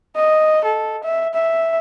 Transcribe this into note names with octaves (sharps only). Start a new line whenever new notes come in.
D#5
A4
E5
E5